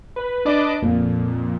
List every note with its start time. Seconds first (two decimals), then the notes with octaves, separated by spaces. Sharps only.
0.16 B4
0.45 D4 B4 D5 D#5 A5 D6
0.82 F2 A#2